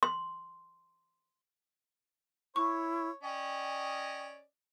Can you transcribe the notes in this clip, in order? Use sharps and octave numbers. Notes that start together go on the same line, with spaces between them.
C6
E4 C#5 C#6
C#4 D5 D#5 G5